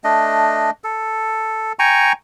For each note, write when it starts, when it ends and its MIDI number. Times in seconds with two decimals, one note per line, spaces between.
0.04 0.70 57
0.04 0.70 62
0.04 0.70 75
0.84 1.73 69
1.79 2.13 79
1.79 2.13 80
1.79 2.13 82
1.79 2.13 85